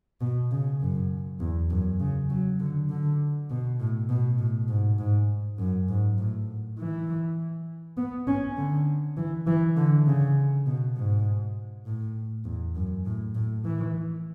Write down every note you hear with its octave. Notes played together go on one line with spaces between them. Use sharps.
B2
C#3
F#2
E2
F#2
C#3
F#3
D3
D3
B2
A2
B2
A2
G#2
G#2
F#2
G#2
A2
E3
B3
C#4
D3
E3
E3
D3
C#3
B2
G#2
A2
E2
F#2
A2
A2
E3